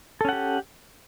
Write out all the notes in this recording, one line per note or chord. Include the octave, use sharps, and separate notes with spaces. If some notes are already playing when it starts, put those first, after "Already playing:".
C#4 G4 A4 F#5